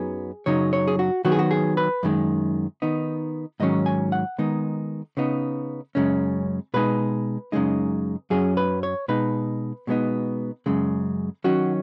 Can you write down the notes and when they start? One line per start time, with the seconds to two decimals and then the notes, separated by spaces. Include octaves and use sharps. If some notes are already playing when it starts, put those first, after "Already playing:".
Already playing: F#2 F#3 B3 D#4 G#4
0.46 F#2 C#3 F#3 D#4 C#5
0.73 C#5
0.88 G#4
0.99 F#4
1.25 D#3 F#3 B3 F#4
1.32 G#4
1.39 F#4
1.51 G#4
1.77 B4
2.03 F#2 D#3 G#3
2.82 D#3 B3 D#4
3.60 G#2 D#3 F#3 C#4 D#5
3.86 G#5
4.12 F#5
4.38 D#3 G#3 B3 D#4
5.17 C#3 B3 D#4
5.95 F#2 C#3 G#3 C#4
6.74 B2 G#3 D#4 B4
7.52 F#2 C#3 G#3 D#4
8.30 F#2 F#3 C#4 G#4
8.57 B4
8.83 C#5
9.08 B2 G#3 D#4 B4
9.87 B2 G#3 B3 D#4
10.66 F#2 C#3 G#3
11.44 D#3 F#3 C#4 F#4